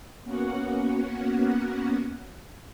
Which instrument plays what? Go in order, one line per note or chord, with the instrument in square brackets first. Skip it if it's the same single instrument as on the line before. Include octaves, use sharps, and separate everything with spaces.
[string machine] A#3 B3 C#4 F#4 F#5